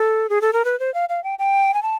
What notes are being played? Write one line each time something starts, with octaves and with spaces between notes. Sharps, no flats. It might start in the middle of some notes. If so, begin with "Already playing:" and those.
Already playing: A4
G#4
A4
A#4
B4
C5
F5
F5
G5
G5
G#5
A5